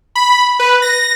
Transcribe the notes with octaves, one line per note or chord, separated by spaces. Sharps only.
B5
B4
A#6